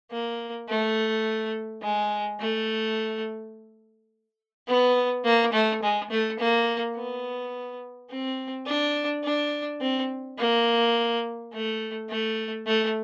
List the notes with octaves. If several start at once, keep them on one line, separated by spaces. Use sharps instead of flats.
A#3
A3
G#3
A3
B3
A#3
A3
G#3
A3
A#3
B3
C4
D4
D4
C4
A#3
A3
A3
A3